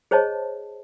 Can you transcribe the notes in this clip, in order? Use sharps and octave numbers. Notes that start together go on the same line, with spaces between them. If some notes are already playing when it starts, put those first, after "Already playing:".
G#4 C5 C#5 D#5 A5